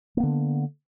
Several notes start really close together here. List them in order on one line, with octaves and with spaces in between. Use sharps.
A#3 B3 D3